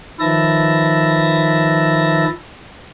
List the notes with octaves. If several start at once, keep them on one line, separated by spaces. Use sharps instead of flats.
D#3 F3 B4 E5 A5 A#6